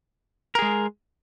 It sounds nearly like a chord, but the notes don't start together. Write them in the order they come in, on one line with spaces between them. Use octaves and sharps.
A#4 G#4 G#3